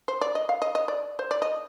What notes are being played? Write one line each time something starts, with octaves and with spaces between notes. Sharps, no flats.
C5
D5
D#5
F5
D#5
D#5
D5
C5
D5
D#5